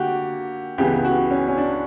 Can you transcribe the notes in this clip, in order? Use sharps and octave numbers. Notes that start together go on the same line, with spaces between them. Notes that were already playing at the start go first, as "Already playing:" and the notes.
Already playing: D3 A#3 F#4 G4
C#2 C#3 E3 B3 G4
F#4
C#4
C#4
D4